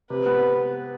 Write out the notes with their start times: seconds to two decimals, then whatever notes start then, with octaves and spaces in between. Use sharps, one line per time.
0.10 C3 B4
0.26 B3